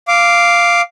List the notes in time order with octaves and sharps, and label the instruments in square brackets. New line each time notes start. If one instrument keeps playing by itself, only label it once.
[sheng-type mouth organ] F5 D6